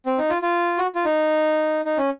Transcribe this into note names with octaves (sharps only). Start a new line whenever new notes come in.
C4
D#4
F4
F4
F#4
F4
D#4
D#4
C#4